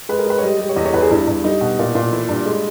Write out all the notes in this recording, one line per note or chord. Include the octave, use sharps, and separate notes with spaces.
G#3 B4
A#4
G#3 B4
C#5
G3 D#5
G3
C#5
E2 D#5
C#5
E2 B4
G#4
G2 E4
G2
G3 D#4
B2
A#2
A#2
E3 E4
G2
G#3